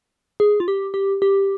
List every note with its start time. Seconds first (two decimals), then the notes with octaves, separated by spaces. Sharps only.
0.40 G#4
0.60 F4
0.68 G4
0.94 G4
1.22 G4